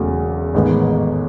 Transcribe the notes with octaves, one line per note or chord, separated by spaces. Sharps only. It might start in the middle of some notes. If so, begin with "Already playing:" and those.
Already playing: E1 E2 C#3 F#3 A3
A1 G#2 D#3 G#3 B3